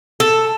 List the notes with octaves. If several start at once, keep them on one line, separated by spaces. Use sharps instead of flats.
A4